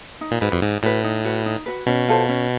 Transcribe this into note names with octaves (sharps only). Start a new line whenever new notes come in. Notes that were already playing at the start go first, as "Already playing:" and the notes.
D#4
A#2
G#2 F#4 B4
F2
G#2 D#4
A2 F#4 B4
D#4
F#4 B4
D#4
F#4 B4
B2 C#4
F4 A4 C5
C#4